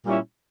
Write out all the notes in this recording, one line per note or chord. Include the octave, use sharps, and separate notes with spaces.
A#2 G3 C#4 E4